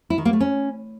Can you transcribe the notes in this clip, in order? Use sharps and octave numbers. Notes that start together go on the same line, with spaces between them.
E4
D#3
A#3
A3
C#4